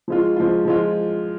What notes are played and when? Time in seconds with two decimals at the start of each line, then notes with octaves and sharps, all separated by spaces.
0.08 F3 G#3 F4
0.36 F3 G#3 F4
0.65 F3 G#3 F4